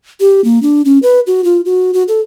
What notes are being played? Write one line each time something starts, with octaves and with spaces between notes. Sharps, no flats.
G4
A#3
D4
C#4
B4
F#4
F4
F#4
F#4
A4